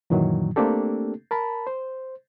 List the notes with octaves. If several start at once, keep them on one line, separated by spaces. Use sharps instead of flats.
F#2 A#2 D#3 E3 F#3
A3 A#3 C4 D4 G4 A4
A#4 A5 B5
C5